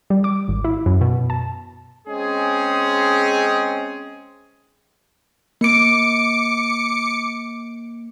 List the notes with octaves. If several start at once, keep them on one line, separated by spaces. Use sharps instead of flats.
G3
D6
G#1
E4
F#2
B2
A5
G#3 C4 C#4 G#4
A#3 D6 C#7 D7